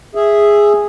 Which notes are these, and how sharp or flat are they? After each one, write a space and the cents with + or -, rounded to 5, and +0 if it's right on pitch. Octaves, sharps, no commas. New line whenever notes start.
G#4 -5 E5 +0